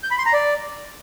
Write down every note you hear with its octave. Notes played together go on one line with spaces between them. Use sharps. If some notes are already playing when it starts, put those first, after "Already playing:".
G6
B5
C6
A#5
D5